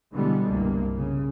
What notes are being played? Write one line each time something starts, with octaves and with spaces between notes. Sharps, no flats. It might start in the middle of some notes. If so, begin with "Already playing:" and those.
B2 D3 E3 G3 G#3 B3
G1 C2 G2 A#3
C#3